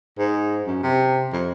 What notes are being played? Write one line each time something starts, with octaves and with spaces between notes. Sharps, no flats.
G#2
F#2
C3
F2